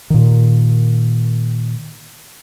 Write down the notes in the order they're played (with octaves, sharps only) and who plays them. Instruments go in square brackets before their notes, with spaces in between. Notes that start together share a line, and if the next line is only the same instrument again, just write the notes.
[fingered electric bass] A#2 D#3